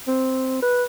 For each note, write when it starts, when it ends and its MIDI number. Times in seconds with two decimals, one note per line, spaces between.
0.07 0.57 60
0.62 0.84 71